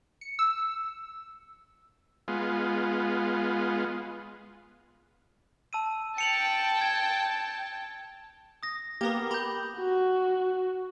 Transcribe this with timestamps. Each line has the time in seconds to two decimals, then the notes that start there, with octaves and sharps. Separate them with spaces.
0.21 C#7
0.39 E6
2.28 G#3 B3 F4
5.73 A5 E6 D#7
6.18 G5 A5 C#7 F7 F#7
6.81 G#6
8.63 D#6 A#6
9.01 A#3 B3 G4 A#4
9.31 G4 B5 G6
9.78 F#4